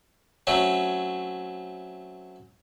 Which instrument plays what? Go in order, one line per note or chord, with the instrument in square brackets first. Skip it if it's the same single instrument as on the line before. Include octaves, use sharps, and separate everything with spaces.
[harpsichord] F#3 A3 C4 C#4